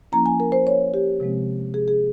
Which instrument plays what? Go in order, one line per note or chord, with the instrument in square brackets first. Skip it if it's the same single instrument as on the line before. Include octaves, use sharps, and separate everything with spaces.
[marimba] F3 A#3 C#4 E4 A#5
G#5
A#4
C5
C#5
G4
C3 F3 G#3 C4
G#4
G#4